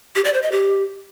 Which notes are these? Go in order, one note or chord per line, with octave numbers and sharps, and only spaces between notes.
G4
D5
C5
D#5
G4